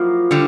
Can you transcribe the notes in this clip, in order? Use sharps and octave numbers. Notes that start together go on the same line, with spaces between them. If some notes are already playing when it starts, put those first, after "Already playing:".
Already playing: F3 F#3 A#3 E4
D3 G3